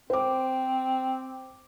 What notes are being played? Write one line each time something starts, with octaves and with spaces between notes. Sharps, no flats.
C4 C5 D6